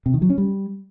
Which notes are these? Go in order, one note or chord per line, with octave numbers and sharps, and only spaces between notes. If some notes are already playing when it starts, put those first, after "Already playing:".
C3
D#3
F#3
C#4
G3